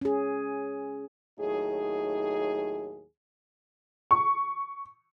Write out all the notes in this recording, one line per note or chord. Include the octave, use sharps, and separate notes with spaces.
C#4 G#4
D#2 A2 F#3 D#4 G#4
C#6